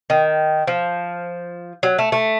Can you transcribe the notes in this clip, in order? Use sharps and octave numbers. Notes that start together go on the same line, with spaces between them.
D#3
F3
F#3
A3
A3